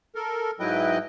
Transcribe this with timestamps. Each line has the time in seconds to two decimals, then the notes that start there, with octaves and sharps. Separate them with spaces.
0.15 A4 A#4
0.60 G#2 F#3 E4 B4 D#5 G5